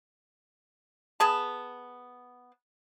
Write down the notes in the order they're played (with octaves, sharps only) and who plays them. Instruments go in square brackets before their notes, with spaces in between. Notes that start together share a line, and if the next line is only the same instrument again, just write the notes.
[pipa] B3 G#4 A5